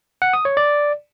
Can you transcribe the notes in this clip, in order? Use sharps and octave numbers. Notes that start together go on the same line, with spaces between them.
F#5
D#6
C#5
D5